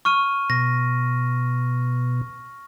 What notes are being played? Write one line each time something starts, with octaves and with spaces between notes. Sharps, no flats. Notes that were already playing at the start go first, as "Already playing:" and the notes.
C#6 F6 D#7
B2 A#6